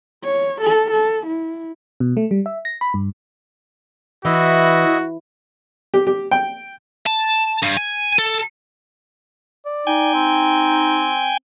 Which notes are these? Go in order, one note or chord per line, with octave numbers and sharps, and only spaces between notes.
C#5
A4
A4
E4
B2
A3
G3
E5
A#6
B5
G2
E3 E4 F#4 D#5 E5
G4
G4
G5
A5
G2
G#5
A4
D5
D#4 G5 G#5
C4